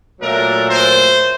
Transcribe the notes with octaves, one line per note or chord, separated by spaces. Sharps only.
A#2 F#3 A3 D4 A#4
C5